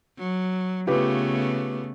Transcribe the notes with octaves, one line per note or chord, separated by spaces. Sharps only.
F#3
C#3 A3 B3 F4 G4 B4